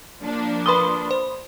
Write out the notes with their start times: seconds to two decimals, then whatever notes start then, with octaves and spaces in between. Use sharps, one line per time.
0.19 F3 A#3 D4
0.66 B4 B5 C6 D#6 G7
1.11 C5